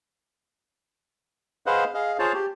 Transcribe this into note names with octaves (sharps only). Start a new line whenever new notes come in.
G#4 B4 C5 D#5 F5 F#5
G#4 D#5 F5
F4 G#4 C5 C#5 F5 A5
G4